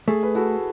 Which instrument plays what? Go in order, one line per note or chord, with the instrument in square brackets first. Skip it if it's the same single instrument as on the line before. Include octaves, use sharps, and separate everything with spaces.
[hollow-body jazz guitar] A3 [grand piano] G#4
[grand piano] B4
[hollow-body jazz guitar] E4 [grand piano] F#4 A4